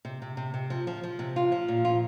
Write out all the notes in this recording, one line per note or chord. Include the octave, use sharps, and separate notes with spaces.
C3
C3
C3
C3
F3
F3
F3
C3
F4
F3
A#2
F4